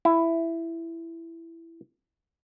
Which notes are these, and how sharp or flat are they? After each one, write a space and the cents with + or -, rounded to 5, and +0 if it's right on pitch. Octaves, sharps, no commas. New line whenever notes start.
E4 +10